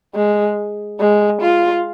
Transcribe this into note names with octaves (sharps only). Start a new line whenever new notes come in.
G#3
G#3
F4